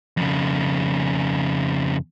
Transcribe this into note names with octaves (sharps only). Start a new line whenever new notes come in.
F2 C#3